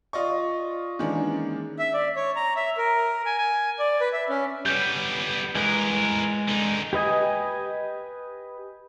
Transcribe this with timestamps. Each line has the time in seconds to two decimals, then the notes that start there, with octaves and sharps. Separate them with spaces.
0.13 F4 D5 D#5 C#6
0.99 D#3 E3 G#3 A#3 C#4 D4
1.79 E5
1.93 D5
2.16 C#5
2.36 A#5
2.56 E5
2.77 A#4
3.26 G#5
3.38 G#5
3.79 D5
4.01 B4
4.13 E5
4.29 C#4
4.66 G3 B3 G6
5.55 E3 G#3 A#4 B4
6.48 D3 D#4
6.93 G4 B4 D#5 G#5